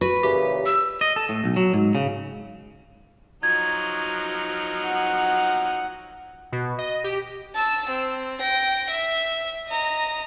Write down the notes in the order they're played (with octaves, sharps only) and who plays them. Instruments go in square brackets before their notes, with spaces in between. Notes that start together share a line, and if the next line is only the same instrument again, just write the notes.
[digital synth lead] F#4 [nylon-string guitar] B4
[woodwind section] A#2 C#3 E3 [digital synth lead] G4
[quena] E6
[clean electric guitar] D#5
A4
A2
B1
F#3
G#2
C#3
[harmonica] F3 F#3 D#4 [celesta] G#6
[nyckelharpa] F#5
[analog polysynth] B2
D#5
G4
[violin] A5 E6
C4
G5 A#6
E5
D#5 A#5